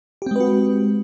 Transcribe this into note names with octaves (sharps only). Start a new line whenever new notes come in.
G#3 C4 F#4 G4 B4